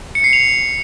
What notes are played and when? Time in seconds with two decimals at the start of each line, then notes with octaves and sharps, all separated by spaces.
0.15 C#7
0.24 C7
0.33 F7